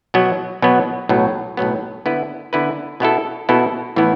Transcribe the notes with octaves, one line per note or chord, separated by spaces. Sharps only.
B2 F#3 B3
B2 F#3 B3
B1 A2 F#3 B3
B1 A2 F#3 B3
D3 B3 E4 B4
D3 B3 E4 B4
B2 B3 E4 A4
B2 B3 E4 A4
A2 E3 B3 E4